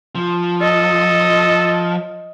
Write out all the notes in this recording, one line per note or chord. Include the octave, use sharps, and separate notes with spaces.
F3
A4 D#5